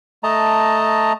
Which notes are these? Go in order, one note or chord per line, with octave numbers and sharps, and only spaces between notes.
A3 D#5 A5 A#5